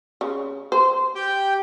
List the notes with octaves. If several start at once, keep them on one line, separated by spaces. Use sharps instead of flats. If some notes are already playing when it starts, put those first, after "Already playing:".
C#3
C5
G4 G5